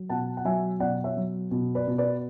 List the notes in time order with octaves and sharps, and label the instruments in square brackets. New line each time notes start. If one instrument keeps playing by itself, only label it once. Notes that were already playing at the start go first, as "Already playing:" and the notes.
Already playing: [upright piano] F#3
B2 F#5 A5
F#5
F#3 E5 G#5
B2 D5 F#5
C#5 E5
F#3
B2
B4 D5
B2
B4 D5